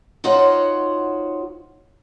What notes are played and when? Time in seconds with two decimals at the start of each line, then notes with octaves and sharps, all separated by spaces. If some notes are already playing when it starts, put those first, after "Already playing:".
0.24 D#4 F4 F#4 C5 C#5 F#5